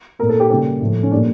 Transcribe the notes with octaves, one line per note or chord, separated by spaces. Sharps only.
A#2 A3 A#4
A4
G4
C#3 G3 A#3 G4
A2 F3 A3
C#4
A#2 G3 A#3 D4